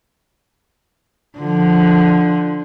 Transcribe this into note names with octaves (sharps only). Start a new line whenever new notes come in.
D3 F3